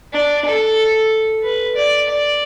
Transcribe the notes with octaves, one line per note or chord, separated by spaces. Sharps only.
D4
A4
B4
D5
D5